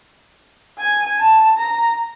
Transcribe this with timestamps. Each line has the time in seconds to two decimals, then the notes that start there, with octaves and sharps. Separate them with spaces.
0.78 G#5
1.19 A5
1.58 A#5